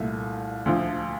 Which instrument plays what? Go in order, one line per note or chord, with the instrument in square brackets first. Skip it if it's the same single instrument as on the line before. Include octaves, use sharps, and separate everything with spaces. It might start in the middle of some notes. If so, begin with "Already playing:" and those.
Already playing: [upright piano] C2 A#2 A3
D2 D3 F3